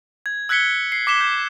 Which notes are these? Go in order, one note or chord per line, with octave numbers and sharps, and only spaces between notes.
G#6
E6 F#6 G#6 B6 C#7 G7
C7
D6 B6 E7 G7
G6